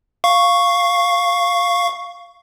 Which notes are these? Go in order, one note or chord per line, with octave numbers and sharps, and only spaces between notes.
F5 C#6